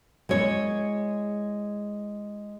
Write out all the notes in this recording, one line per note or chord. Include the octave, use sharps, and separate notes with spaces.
G#3 E4 C#5